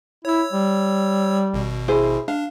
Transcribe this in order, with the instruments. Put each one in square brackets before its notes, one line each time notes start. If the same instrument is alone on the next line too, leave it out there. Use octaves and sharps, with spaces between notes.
[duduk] E4 [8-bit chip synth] C#5 E6
[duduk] G3
[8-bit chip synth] G#1 B2
[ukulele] E4 G#4 C5
[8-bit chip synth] D4 [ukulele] F5